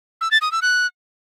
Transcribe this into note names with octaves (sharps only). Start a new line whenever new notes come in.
E6
A6
D#6
E6
F#6